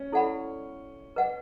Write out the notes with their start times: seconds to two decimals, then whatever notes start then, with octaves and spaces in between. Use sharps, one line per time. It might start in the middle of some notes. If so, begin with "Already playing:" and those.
Already playing: C#4
0.12 E4 A4 D5 F#5 B5
1.16 B4 D#5 F#5